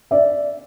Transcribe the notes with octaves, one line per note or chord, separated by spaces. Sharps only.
D5 E5